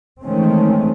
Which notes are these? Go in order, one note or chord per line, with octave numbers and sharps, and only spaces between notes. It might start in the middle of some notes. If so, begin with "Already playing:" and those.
D#3 E3 G#3 A3 C4 C#4